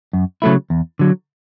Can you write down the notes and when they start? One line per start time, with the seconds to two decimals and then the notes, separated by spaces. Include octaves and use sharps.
0.13 F#2
0.42 C#3 F#3 A3 E4
0.70 E2
0.99 D3 F#3